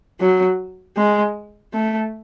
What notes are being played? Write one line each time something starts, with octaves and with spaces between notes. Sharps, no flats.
F#3
G#3
A3